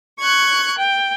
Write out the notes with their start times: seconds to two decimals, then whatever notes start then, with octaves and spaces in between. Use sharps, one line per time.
0.21 C#6 F#6 G#6
0.79 G5